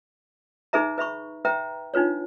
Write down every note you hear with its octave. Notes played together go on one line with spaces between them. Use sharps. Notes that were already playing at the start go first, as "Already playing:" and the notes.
D#4 G#4 B4 E5 A#5
B4 E5 B5 C#6
B4 E5 G5 A#5
D4 D#4 F4 B4 C#5